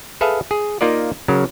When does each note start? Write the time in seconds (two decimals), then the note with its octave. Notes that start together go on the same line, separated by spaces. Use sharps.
0.21 G#4 A4 B4 E5 F5
0.51 G#4
0.81 A#3 D#4 F4 A#4 D5
1.28 C#3 F#3 A#4